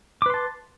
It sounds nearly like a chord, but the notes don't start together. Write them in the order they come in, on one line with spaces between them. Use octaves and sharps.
D6 B4 C6 A5